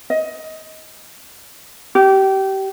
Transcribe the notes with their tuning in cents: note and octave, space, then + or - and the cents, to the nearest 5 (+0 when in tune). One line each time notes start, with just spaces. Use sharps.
D#5 +20
G4 -25